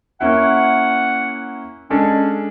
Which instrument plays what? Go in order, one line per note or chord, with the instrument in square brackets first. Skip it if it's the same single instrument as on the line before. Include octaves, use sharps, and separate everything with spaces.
[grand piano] A#3 C#4 E4 [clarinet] F#5
[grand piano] G#3 D4 A4 [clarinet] C#4